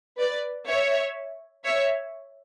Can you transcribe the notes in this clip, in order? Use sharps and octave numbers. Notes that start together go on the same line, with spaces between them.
B4 D5
C#5 E5
C#5 E5